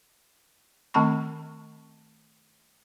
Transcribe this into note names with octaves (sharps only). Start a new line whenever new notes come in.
D#3 A3 C4 A5 B5 C#6